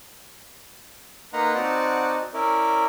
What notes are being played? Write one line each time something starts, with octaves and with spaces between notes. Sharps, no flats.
A#3 D#4 B4 F#5 A#5 C6
C4 D#4 F#4 D5 F#5 A5
C#4 E4 A#4 D5